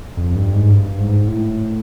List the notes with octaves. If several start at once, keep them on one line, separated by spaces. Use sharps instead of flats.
F2
G2
G#2
G2
G#2
A2